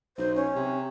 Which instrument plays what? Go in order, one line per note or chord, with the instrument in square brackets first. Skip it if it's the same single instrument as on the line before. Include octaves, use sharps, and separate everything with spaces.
[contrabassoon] B1 [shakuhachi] C5
[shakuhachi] C#4
[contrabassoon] C3